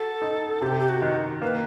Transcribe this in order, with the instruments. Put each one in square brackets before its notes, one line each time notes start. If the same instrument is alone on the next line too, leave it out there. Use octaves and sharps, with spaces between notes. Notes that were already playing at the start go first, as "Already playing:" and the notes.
Already playing: [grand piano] F#4 [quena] A4
[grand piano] D#4
[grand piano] C3 [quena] G4
[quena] G4
F#4
[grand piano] D#3
[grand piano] A#3 [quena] B4